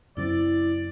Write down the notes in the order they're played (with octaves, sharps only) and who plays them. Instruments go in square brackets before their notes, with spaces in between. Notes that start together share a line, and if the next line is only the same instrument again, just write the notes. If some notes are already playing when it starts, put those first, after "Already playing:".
[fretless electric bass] F#2 C#3 C4 [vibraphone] E4 [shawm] D5